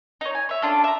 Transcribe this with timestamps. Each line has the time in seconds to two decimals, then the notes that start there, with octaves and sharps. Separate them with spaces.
0.21 D#4 C#5
0.35 G#5
0.49 C#5 E5
0.62 C#4 D4 F4 A4
0.84 E5 A#5